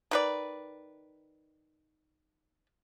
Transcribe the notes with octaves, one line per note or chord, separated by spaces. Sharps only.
D#3 B4 D5